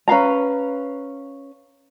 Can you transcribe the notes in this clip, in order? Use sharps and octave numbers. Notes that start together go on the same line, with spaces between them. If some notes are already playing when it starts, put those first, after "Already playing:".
C#4 B4 F5 A#5